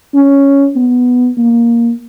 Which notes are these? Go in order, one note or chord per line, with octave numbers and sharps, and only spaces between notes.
C#4
B3
A#3